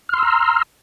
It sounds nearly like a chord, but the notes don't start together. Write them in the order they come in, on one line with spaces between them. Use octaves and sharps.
F6 C6 E6 A#5